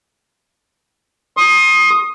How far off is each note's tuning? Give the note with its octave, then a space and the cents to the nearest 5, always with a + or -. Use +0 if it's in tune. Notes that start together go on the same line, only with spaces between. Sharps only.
C6 +35 D#6 +0